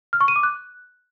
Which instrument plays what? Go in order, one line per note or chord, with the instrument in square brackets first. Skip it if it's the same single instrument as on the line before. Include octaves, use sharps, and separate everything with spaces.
[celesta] F6
C#6
D#7
D6
F#6